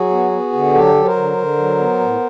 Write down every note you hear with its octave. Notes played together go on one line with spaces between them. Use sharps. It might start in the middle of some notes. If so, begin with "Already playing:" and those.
Already playing: F#3 F#4 G#4
B3
B3
D3
F#3 G4 A4
F#3
A#4 C5
D3
D3
F#3
B3
A2